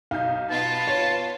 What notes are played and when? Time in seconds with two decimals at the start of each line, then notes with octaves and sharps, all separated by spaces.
0.11 B1 D#4 F5 G6
0.50 B3 F4 A5
0.87 C#5